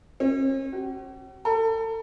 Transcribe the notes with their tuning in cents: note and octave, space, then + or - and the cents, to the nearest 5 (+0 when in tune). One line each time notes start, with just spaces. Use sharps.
C#4 -45
F#4 +45
A4 +30